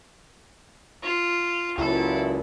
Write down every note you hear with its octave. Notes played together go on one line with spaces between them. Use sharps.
F4
C#2 A#2 F#3 E4 A4